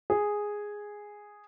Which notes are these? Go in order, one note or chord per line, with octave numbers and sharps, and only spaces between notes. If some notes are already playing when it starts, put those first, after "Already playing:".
G#4